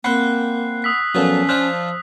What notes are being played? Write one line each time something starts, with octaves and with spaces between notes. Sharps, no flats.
A#3 C4 C5 F#5 B5 F#6 C7
D#6 E6 B6
A#2 F3 F#3 B3 C#4 A4
F3 D4 C5 F6 F#6